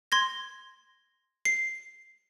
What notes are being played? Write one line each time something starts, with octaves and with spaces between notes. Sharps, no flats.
C6 G#6 A#6
C7